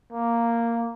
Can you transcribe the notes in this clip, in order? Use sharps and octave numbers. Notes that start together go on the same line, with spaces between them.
A#3